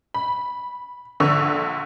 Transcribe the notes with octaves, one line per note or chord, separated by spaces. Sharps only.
B5
A#1 D3 C#6 E6